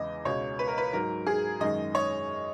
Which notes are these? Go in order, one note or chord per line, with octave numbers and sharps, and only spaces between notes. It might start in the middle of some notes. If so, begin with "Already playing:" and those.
Already playing: E2 C#3 E3 G#3 D#5
C#2 B2 G#3 C#5
B4
A#4
B4
G#2 F#3 A#4
G#4
F#2 D#3 G#3 D#5
C#5